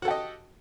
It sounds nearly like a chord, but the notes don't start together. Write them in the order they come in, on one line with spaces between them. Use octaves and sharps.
F#4 A4 G4 D#5